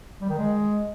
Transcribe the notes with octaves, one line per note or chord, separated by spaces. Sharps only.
G3
D#3
G#3